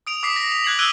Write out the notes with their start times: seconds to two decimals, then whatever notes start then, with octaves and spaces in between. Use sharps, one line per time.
0.07 D#6 D7 F7
0.23 D6 D#6 B6 C7
0.36 A#6
0.49 C7 F7
0.64 F#6 G#6 C7 F#7
0.79 E6 F#6 G#6 D7 D#7 G7